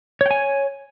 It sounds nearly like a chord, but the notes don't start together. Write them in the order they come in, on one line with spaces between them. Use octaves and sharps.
C#5 G5 G#5